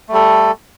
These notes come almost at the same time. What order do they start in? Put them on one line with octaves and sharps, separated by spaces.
A3 G3 A4